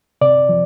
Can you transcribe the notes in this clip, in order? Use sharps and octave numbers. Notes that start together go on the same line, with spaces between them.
C3 D5
F3